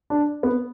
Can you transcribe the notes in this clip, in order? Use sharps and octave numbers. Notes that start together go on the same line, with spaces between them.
D4
B3